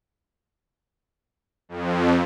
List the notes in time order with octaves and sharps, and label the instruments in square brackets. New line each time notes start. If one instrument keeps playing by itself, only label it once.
[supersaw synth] F2